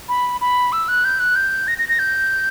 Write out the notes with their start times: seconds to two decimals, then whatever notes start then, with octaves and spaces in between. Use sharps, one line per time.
0.09 B5
0.41 B5
0.72 E6
0.88 F#6
1.05 G6
1.20 F#6
1.36 G6
1.68 A#6
1.78 A#6
1.89 A#6
1.99 G6